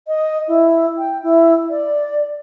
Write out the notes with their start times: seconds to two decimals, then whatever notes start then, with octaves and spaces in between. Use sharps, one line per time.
0.07 D#5
0.47 E4
0.98 G5
1.22 E4
1.70 D5